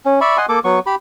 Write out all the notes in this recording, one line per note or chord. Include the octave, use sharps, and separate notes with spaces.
C#4
D5 E5 B5 C#6
D#5 F#5 G#5 C6
A#3 A4 D6
F#3 B3 C#6
G4 B5